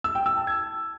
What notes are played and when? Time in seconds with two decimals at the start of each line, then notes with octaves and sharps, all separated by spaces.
0.04 E6
0.15 G5
0.26 E6
0.36 A5
0.47 G#6